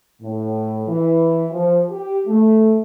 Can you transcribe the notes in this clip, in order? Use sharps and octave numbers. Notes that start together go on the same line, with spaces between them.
A2
E3
F3
G4
A3